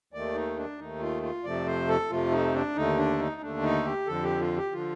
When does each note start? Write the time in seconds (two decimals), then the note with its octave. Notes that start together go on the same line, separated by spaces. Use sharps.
0.13 D#2 D#3 A3 D5
0.35 D#4
0.57 D4
0.78 D#2 D#3 A3 D#4
1.01 F4
1.23 F4
1.44 F2 C3 F3 A3 D5
1.66 C5
1.88 A4
2.10 F2 C3 F3 A3 F4
2.32 D#4
2.54 D4
2.75 D#2 D3 A3 D#4
2.97 D4
3.19 D#4
3.41 D#2 D3 A3 D4
3.63 D#4
3.85 G4
4.07 F2 D3 F3 A4
4.23 G4
4.40 F4
4.56 G4
4.72 D3 F3 F4